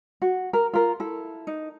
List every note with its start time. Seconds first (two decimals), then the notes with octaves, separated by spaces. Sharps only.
0.22 F#4
0.53 A#4
0.73 F4 A#4
1.00 E4 A4
1.47 D#4